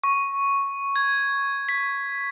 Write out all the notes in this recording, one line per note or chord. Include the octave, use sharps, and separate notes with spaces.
C#6
G#6
B6